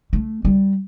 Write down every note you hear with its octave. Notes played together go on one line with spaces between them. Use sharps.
A3
G3